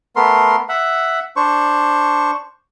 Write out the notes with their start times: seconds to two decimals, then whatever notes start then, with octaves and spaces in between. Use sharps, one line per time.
0.16 A3 B3 A#4 C6
0.69 E5 F#5
1.36 D4 C5 C#6